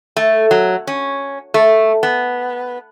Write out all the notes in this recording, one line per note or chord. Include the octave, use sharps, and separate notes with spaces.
A3
F#3
C#4
A3
B3